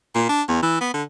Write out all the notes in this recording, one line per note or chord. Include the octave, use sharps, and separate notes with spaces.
A#2
D4
E2
E3
B3
D3